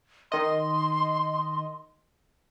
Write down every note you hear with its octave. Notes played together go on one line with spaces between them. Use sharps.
D#3 D#5 C6